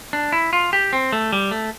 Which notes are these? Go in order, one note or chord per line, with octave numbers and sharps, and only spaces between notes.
D4
E4
F4
G4
C4
A3
G3
A3